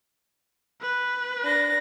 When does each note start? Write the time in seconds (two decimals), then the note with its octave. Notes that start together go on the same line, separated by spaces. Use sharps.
0.81 B4
1.43 D4 A#6